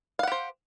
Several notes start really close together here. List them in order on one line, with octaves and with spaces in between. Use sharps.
F5 F#5 G4 C5